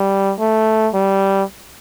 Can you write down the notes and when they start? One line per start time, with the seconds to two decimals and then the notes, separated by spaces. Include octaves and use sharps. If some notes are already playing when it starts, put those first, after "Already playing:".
Already playing: G3
0.39 A3
0.94 G3